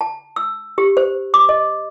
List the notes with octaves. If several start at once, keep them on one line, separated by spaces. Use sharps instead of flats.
A5
E6
G4
C5
D6
D#5